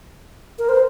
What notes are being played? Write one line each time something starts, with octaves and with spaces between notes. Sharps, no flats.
A#4
C5